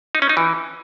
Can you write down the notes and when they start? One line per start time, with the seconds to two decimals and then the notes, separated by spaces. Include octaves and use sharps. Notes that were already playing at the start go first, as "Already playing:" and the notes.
0.15 D#4
0.22 C#4
0.29 D#4
0.37 E3